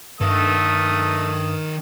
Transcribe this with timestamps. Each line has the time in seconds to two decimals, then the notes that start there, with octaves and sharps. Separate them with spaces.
0.21 G2 D#3 A3 A4 D#6